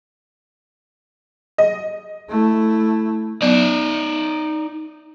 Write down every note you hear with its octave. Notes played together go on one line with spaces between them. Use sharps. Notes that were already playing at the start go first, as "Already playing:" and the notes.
D#5
A3 E4
F#3 B3 D#4 D5